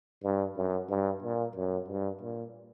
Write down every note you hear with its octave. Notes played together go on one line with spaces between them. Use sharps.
G2
F#2
G2
A#2
F#2
G2
A#2